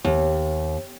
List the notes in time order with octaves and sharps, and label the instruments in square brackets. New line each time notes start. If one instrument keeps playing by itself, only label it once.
[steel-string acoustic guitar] D#2